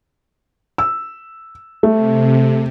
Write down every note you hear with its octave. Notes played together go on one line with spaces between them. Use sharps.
E6
C3 A3